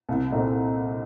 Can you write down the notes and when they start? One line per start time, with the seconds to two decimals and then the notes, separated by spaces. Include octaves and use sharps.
0.09 C2
0.30 A#2 A3 C4 D#4